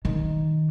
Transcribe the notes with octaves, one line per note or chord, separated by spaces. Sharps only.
D#3